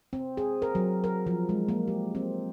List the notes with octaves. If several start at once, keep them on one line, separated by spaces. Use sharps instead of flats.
C4
G#4
A#4
F#3
A#4
F3
G#3
A#3
G4
C4